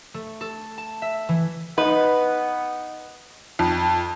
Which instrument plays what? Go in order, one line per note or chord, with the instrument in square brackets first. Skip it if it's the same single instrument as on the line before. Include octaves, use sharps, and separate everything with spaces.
[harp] A3
A4
A5
E5
E3
[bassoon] B3 [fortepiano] D#4 [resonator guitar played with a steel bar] B4
[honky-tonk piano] F2